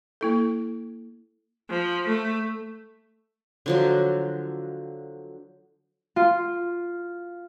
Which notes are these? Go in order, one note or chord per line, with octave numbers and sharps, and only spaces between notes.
A#3 E4 A4
F3
A3
D3 F3 F#3
F4